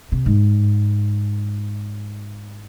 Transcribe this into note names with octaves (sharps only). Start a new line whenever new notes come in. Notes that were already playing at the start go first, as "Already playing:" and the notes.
C3
G#2